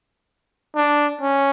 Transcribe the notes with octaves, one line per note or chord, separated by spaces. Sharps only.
D4
C#4